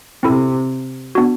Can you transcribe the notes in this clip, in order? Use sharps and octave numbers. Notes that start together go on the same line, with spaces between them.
C3 C4 E4 A4
B3 D4 F#4